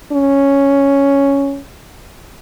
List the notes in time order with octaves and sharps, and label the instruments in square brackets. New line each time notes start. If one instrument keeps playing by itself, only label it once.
[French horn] C#4